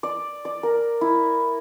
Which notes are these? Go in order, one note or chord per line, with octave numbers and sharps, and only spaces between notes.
D5
D5
A#4
E4